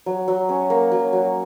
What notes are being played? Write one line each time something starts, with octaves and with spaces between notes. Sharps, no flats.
F#3
F#3
C#4
A#3
F#3
F#3